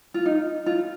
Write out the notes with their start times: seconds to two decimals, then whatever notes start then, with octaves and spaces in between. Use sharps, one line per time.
0.14 F4
0.26 D#4
0.66 F4